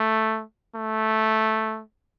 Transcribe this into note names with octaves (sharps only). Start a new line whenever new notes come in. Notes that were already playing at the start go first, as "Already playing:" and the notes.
Already playing: A3
A3